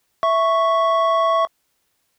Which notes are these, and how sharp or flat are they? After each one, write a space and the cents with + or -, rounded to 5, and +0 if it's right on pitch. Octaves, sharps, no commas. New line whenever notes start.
E5 +0 C#6 +0